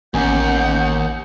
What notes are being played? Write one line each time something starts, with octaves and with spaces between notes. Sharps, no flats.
A1 D#2 A#3 B3 C#4 F#5 G#5 G6